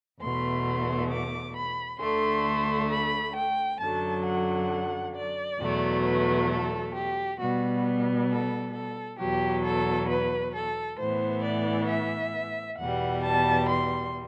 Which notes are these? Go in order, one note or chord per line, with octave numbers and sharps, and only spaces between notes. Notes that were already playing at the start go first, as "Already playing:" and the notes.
E2 B2 A3 C6
D6
B5
D2 D3 A3 C6
B5
G5
F#2 D3 F#3 A5
F#5
D5
E2 B2 F#3 A3
B4
A4
G4
B2 G3 B3 F#4
A4
A4
E2 B2 F#3 G4
A4
B4
A4
A2 E3 B3 C5
D5
E5
E2 B2 G3 F#5
A5
C6